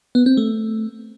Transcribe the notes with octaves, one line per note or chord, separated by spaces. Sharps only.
B3
C4
A3